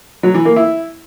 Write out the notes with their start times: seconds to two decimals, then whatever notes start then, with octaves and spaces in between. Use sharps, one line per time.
0.23 F#3
0.34 E3
0.45 A#3
0.56 E4